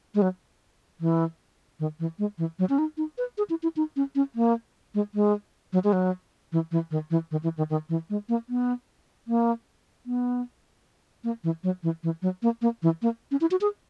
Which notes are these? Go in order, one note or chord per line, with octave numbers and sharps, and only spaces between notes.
G#3
F#3
E3
D#3
E3
G#3
E3
F#3
C#4
D#4
D#4
B4
G#4
E4
E4
D#4
C#4
C#4
A#3
G#3
G#3
F#3
G#3
F#3
E3
E3
D#3
E3
D#3
E3
D#3
D#3
E3
G#3
A#3
B3
A#3
B3
A#3
E3
F#3
E3
E3
F#3
A#3
A#3
E3
A#3
C#4
E4
F#4
G#4